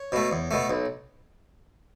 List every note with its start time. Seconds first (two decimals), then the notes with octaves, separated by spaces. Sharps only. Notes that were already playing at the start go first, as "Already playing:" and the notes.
Already playing: C#5
0.12 B2 A3
0.31 E2
0.51 B2 A3
0.70 B1